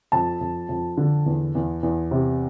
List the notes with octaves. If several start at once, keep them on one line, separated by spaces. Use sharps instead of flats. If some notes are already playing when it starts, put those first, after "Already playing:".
F2 A5
F2
F2
D3
E2
E2
E2
C3